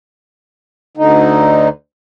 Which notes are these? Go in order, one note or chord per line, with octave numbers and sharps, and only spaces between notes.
D2 D3 D#4